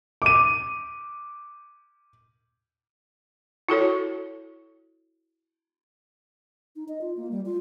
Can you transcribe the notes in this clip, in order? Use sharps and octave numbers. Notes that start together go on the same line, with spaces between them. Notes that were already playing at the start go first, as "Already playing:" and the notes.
D6 D#7
E4 F#4 A4 C#5
D#4
D#5
F4
A#3
G3
F4